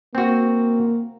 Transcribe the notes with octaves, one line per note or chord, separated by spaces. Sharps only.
A#3 C4 F#4